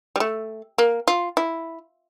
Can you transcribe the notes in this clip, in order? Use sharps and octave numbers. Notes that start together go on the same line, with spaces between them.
G3
A3
A#3
F4
E4